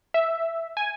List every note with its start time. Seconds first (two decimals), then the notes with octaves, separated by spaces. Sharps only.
0.14 E5
0.77 G#5